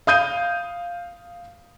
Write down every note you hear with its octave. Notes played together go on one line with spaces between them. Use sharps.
F5 D#6 G6 D#7